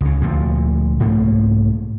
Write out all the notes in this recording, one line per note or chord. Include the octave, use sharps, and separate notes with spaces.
C#2 C#3
D2 A#2 F3
C2 G#2 A3 A#3